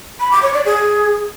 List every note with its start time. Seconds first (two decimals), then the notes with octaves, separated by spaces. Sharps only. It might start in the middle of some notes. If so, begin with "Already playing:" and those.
0.20 B5
0.31 D6
0.43 C#5
0.54 D5
0.65 G#4